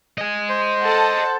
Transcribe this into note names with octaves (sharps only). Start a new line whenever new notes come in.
D#5 G#5
C5
A4 F#5 A5